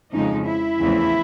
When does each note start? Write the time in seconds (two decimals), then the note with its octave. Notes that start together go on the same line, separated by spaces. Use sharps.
0.12 F2 C#3 F3 G#3 D#4
0.46 E4
0.80 E2 C#3 F3 A3 C4